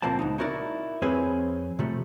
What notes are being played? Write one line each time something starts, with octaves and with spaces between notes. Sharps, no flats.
C#2 A#2 F3 A#3 C4 A5
C#2 B3 D#4
D#4 E4 F#4 A#4 D5
F2 C4 C#4 G#4 B4
C3 F3 G3 A3